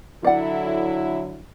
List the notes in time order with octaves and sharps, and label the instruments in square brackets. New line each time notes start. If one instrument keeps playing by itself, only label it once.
[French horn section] D3 F#3 E4 [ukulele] D5 F#5